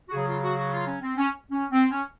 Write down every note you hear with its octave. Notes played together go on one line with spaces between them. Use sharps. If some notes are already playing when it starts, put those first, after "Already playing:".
F#4
C#3 F#3 G#4
F4
F#4
F#4
F4
C#4
C4
C#4
C#4
C4
C#4